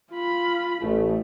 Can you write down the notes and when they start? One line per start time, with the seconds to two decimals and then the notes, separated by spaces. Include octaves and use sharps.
0.12 F4 B5
0.81 A1 A3